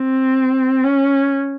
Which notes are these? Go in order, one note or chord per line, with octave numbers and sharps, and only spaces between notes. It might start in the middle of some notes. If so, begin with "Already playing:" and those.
Already playing: C4
C#4